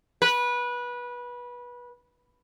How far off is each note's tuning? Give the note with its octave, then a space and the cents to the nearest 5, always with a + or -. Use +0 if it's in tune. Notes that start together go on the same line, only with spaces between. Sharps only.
B4 -20